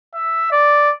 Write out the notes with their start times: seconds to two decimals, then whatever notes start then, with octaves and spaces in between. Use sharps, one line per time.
0.15 E5
0.52 D5